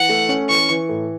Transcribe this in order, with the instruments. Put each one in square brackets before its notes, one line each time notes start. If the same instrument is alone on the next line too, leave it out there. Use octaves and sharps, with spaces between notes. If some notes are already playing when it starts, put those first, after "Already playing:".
Already playing: [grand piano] E3 [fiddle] F#5
[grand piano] A3
C#4
[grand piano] E3 [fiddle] C#6
[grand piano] E3
A2